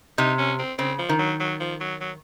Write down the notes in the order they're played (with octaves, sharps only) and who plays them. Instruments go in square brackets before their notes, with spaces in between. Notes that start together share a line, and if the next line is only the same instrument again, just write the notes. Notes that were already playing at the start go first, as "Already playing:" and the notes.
[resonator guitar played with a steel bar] C3 [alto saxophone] D#4
[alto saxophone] C#4
C4
[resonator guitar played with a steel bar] C#3 [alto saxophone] C4
[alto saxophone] F3
[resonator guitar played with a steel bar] D#3
[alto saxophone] F#3
F#3
F3
F#3
F#3